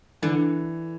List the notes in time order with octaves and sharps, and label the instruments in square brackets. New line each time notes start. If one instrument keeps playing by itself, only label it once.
[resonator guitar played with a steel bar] D3 [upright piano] E3